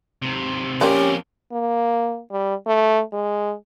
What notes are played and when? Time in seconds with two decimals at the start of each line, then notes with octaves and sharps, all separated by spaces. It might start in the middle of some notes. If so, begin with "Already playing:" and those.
0.22 D#2 C3
0.81 F2 A#3 C4 C#4 G4 A#4 D5
1.52 A#3
2.31 G3
2.66 A3
3.12 G#3